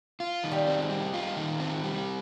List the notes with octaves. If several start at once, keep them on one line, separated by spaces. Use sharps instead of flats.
F4
D#3
G3
C4
G#3
G3
F4
D#3
C4
G3